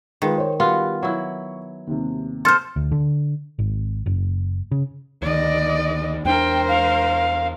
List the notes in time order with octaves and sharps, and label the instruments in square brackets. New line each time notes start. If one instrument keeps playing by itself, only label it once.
[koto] D#3 [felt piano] G#3 F4 B4
[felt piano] C5 C#5
[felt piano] G3 [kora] B3 F4 F#4
[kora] F#3 E4 [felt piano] C#6
[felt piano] D#2 C3
[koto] A4 C5 [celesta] C6 F6
[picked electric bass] D2
D3
G#1
F#1
C#3
[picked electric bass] D2 D#3 [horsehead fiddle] D5 D#5
[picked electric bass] E2 C#4 D4 [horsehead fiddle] A#4 C5 [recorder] G5
[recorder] F5